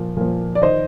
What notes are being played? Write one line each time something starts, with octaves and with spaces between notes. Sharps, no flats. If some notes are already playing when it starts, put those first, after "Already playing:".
Already playing: A#2 F3
A#2 F3
D5
D#3 C5 D#5